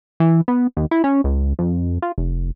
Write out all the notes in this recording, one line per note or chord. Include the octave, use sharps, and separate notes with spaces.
E3
B3
D#2
E4
C#4
C#2
F2
F4
F1